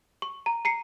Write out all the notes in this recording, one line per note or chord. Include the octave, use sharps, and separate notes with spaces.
C#6
A#5
A#5 C7 C#7